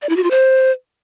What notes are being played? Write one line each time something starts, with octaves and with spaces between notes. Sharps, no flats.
D5
E4
F#4
F4
C5